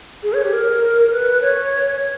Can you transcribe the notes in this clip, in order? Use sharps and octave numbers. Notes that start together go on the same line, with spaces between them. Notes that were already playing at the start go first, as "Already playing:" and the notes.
G#4
C#5
G4
A#4
B4
C#5